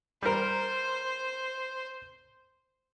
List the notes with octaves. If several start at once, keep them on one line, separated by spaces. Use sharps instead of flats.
G3 A#4 C5